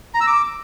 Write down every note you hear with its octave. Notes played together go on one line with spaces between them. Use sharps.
A#5
E6
D6